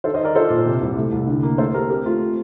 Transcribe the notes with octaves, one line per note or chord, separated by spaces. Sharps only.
D#3 A4 C5
C5 D#5
D#4
A#4 D5
F4 A4 C5
A#2
C3
C2
A3
C2
D3
A#3
A3 A4 C5
A3 G4 A#4
C4 G4 A#4
A3 F4
C4